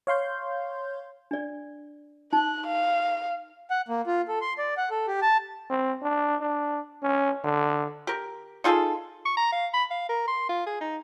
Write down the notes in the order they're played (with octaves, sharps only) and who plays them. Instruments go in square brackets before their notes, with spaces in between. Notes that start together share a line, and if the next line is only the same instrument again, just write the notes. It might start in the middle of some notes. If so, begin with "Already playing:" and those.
[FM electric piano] C#5 F5 C6 G6
[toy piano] D4 D5
[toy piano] D#4 A5 [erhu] F#6
[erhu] F5
[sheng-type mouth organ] F#5
A#3
F4
A4
C6
D5
F#5
A4
G4
A5
[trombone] C4
D4
D4
C#4
D3
[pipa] G4 A#4
D#4 F4 G#4 A4
[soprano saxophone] C#6
A#5
F5
B5
F5
A#4
C6
F4
G#4
D#4